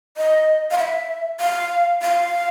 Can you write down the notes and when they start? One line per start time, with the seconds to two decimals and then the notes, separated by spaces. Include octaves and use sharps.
0.17 D#5
0.71 F5
0.78 E5
1.40 F5
2.02 F5